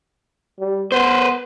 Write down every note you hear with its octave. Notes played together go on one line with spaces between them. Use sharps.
G3
B3 B4 C5